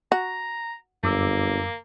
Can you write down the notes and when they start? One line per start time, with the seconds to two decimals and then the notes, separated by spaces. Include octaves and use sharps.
0.12 F#4 A#5
1.04 G1 F#2 A#3 D6 E6